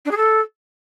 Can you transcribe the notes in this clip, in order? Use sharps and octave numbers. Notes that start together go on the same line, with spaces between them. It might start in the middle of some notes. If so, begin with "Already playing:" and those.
D4
G#4
A4